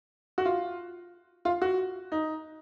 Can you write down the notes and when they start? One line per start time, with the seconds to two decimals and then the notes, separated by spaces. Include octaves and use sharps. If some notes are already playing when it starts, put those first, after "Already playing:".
0.38 F#4
0.45 F4
1.45 F4
1.62 F#4
2.12 D#4